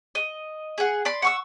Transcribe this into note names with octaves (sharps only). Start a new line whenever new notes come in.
D#5
G#4 F#5
D5 B5 C6
F#5 C#6 E6